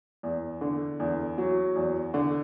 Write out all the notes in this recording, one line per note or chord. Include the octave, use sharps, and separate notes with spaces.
E2
D3
E2
F#3
E2
D3